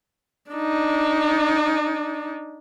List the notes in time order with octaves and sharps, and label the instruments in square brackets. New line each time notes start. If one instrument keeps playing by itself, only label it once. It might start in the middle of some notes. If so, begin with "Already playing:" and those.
[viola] D4 D#4